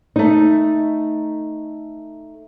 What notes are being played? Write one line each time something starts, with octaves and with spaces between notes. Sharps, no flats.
A3 D#4